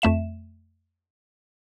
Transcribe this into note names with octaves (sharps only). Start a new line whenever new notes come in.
F2 A3 E5 E7